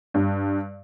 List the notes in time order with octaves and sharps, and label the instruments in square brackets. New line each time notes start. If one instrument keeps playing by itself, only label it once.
[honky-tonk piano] G2